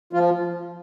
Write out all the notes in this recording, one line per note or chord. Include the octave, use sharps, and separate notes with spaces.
F3 F4